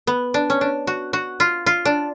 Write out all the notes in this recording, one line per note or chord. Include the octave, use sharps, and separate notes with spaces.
B3
D4
C#4
D4
F#4
F#4
F4
F4
D4